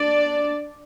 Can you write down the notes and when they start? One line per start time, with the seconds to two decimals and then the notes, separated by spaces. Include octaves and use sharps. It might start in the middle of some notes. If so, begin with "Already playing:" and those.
Already playing: D4 D5